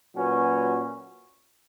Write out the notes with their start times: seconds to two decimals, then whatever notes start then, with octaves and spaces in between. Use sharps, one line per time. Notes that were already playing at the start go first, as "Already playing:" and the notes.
0.14 A#2 F#3 C#4 F#4 B4